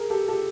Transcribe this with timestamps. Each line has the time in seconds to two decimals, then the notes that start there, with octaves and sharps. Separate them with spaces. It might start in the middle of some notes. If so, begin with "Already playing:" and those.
Already playing: G#4 A#4
0.10 G4 A4
0.28 G4 A4